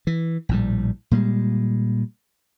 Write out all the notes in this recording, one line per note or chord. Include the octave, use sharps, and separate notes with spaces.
E3
A#1 A2 G3
A#2 G3 G#3